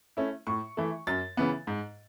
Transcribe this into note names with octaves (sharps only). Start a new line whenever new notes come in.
A3 C#4 E4
A2 C#6
E3 A3
F#2 A6
C#3 E3 B3
G#2